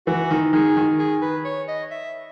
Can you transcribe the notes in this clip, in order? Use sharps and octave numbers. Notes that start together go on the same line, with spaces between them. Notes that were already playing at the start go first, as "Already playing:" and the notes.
E3 F#4
D#3
D#3 G#4
D#3
G#4
B4
C#5
D#5
E5